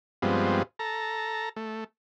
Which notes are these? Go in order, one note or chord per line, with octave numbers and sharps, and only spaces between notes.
G2 F3 G#3 B3 C4
A4 A#5
A3